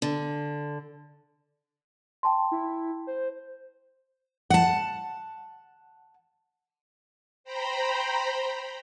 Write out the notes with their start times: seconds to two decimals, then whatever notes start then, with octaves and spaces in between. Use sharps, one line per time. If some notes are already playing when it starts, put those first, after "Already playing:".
0.02 D3
2.23 G5 A5 C6
2.52 E4
3.07 C5
4.50 F#5 A5
7.44 C5 G5 A#5 B5